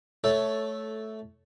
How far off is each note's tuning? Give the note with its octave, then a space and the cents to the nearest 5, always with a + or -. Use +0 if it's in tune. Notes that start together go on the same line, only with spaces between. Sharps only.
A3 -10 A4 +0 C#5 +5